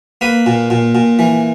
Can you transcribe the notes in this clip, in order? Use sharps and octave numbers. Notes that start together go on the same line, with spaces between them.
A#3 B4
A#2
A#2
A#2
E3